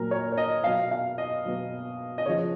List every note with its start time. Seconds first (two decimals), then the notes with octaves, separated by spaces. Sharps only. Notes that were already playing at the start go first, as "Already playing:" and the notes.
Already playing: A#2 F#3 A#4
0.11 C#5
0.32 C#5
0.37 D#5
0.64 B2 F#3 F5
0.91 F5
1.18 D#5
1.45 B2 F#3
2.18 D#5
2.26 C#3 F3 C#5